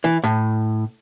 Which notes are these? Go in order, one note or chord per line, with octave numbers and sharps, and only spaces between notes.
E3
A2